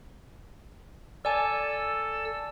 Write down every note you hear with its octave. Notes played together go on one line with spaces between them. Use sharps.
A4 D5 G#5 E6